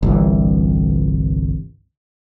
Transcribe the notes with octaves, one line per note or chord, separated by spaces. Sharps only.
G1 C2 E3